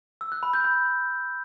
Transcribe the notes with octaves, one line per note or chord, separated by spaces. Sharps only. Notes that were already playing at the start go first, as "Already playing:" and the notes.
E6
F#6
B5
G6
B5